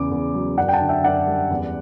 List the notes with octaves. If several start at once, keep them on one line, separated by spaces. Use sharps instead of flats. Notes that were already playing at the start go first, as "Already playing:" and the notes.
Already playing: E2 C#3 D6
E2
F#3
F#2 D5 F#5
G5
F#5 A5
D3
E5 G5
F#2 D5 F#5
G3
E2